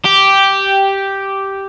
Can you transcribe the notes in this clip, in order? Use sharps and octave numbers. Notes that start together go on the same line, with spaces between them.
G4